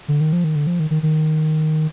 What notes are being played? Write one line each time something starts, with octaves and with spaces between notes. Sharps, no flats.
D3
D#3
F3
D#3
D3
F3
D#3
D#3
D#3